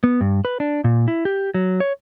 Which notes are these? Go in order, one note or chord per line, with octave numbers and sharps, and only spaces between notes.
B3
G2
B4
D4
A#2
E4
G4
F#3
C#5